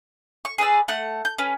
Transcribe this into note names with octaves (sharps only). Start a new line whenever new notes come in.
C#6
G#4 B4 D5 E6
A3 F#5 F#6
G6
C#4 B4